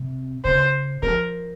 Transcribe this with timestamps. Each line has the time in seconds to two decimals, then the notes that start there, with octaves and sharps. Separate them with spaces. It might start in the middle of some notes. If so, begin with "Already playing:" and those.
Already playing: C3
0.45 C#3 C5
1.03 F3 A#4